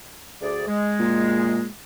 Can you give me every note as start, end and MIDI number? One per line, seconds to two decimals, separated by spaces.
0.42 0.66 38
0.42 0.66 68
0.42 0.66 74
0.68 1.68 56
1.00 1.64 46